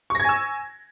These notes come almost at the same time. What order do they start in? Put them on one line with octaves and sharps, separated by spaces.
C#6 A#6 G#6 G#5 E6